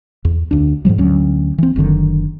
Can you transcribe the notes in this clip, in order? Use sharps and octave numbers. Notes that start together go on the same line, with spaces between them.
E2
D2 D4
G#2 C3 F3 G3
D2 F#3 C#4
E3 C4
F#1 F#2 D3 D#3